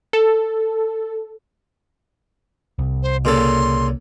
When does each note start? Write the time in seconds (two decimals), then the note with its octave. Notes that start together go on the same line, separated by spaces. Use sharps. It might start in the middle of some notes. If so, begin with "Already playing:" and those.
0.13 A4
2.79 C2
3.03 C5
3.25 A#2 C#3 A4 C6